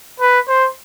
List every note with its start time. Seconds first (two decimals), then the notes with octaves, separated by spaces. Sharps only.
0.20 B4
0.48 C5